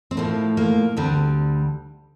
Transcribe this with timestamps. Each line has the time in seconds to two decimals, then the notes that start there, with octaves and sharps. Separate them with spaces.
0.11 C4
0.17 A2 F3 A3 A#3
0.57 A#3
0.97 D2 D3 G3 C4